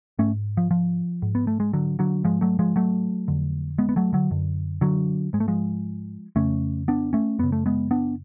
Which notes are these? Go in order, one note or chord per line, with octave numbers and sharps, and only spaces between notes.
G#2 A3 C#4
F3
F3
G#2
B3
A3
G#3
D3 F#3
D3 F#3
G#2 F3 G#3
F#3 A3
F3 G#3
F#3 A3
F2 D3
G#3 B3
B3
F#3 A3
D3 F#3
F#2 D3
D3 F#3
G#2 G#3
A3
F3 G#3
F2 C#3 A3 C#4
B3 D4
A3 C#4
F#2 C#3 B3
A3
G#3 B3
B3 D4